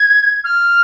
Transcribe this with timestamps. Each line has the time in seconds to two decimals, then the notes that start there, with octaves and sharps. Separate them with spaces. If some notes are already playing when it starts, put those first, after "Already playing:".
Already playing: G#6
0.44 F6